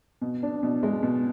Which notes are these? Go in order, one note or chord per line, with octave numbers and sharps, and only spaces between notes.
B2
D4
B2
G#3
B2